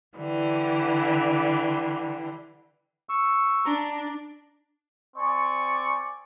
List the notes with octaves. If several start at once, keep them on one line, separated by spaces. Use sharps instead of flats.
D3 E3 G3
C#6 E6
D4 A#5
C4 D5 G#5 C#6